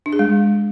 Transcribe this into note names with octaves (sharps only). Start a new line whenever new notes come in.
D4
G#4
G#3